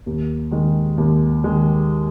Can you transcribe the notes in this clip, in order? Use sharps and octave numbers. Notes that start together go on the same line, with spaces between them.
D#2
D#3 G#3
D#2
D#3 G#3